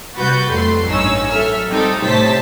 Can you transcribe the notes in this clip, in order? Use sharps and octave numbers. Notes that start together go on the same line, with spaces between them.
C3 G3 F#4 B4 G6 A6
F2 G3 A3 C6
A1 G2 C#4 D#4 E6
F#3 A4 E5 E6 F6
G3 C4 D#4 G4 A4
A2 C3 C5 C#5 A5 B6